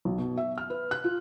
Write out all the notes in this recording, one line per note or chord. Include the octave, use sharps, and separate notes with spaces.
B1
B2
E5
F6
B4
F#6
F4